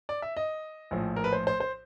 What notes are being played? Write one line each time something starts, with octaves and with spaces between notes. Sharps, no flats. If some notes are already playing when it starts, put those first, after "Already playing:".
D5
E5
D#5
A#1 A2 F3
A#4
B4
C5
C5
C5